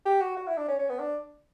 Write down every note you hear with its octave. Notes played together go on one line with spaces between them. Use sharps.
G4
F#4
F#4
E4
D4
C#4
C#4
B3
D4